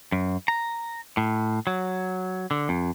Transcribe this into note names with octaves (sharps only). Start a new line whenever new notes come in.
F#2
A#5
A2
F#3
D3
F2